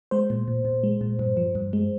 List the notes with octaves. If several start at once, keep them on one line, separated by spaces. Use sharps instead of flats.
G#3 C5
A#2
A#2
A#2
G#3
A#2
G2
F3
G2
G#3